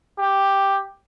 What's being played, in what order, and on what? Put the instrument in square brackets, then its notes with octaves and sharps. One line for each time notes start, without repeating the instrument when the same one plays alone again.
[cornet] G4